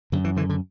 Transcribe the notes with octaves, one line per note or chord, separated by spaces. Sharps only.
F#2 D3
E3
D3 E3
D3